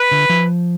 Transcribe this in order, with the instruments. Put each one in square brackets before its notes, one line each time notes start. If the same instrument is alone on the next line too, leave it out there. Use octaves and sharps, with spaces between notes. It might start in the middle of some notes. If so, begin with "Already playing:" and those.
Already playing: [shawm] B4
[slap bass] D3
F3